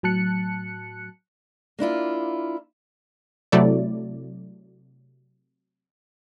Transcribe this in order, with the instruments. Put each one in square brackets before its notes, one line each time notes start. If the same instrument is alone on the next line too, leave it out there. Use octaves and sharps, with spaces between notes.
[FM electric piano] A2 F#3 A5 F#6 C#7
[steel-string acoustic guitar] A#3 D4 E4 F4
[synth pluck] C3 F#3 A3 E4 D5